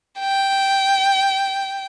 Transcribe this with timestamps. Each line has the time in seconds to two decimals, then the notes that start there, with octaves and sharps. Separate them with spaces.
0.20 G5